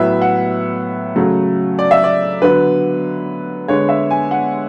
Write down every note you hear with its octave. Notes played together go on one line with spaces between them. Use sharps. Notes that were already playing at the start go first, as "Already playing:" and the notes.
Already playing: A2 F#3 B3 E5
F#5
C#3 F#3 A3
D5
E5
D5
D3 F#3 B3 B4
D3 G#3 B3 C#5
E5
G#5
F#5